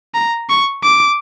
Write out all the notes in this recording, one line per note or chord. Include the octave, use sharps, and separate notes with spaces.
A#5
C#6
D6